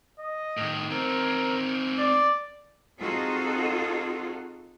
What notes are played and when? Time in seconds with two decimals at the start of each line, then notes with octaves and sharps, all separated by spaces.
0.20 D#5
0.57 A2 D#3
0.90 C4 D#4 A#4
1.99 D5
3.00 C4 D#4 F4 F#4 G#4 A4